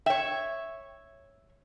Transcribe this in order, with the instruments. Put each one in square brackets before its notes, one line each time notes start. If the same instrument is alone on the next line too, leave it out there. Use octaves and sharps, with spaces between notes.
[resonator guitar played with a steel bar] C#5 E5 [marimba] G5